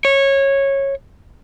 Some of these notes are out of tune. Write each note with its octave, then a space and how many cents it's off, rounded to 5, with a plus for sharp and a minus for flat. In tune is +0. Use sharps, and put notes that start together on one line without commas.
C#5 -15